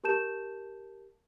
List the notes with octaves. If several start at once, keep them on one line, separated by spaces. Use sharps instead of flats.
G4 A#4 A5 G6 E7